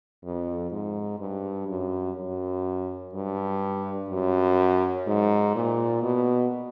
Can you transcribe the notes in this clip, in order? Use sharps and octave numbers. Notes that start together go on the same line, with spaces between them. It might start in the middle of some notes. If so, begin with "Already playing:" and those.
F2
G#2
G2
F#2
F#2
G2
F#2
G#2
A#2
B2